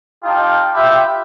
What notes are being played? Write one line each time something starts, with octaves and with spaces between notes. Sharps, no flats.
D#4 F4 G4 G5 A5
F4 G4 B4 E5 G5